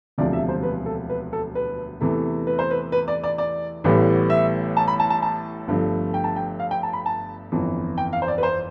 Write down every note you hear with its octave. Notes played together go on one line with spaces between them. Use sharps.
E1 D2 C3 F3 D5
E5
C5
B4
A4
B4
A4
B4
E2 C3 E3 A3
B4
C5
B4
B4
D5
D5
D5
A1 A2 E3 G3 B3
E5
A5
B5
A5
A5
A5
G1 G2 F3 A3
G5
A5
G5
F5
G5
A5
B5
A5
G1 F2 E3
G5
F5
C5
D5
B4
C5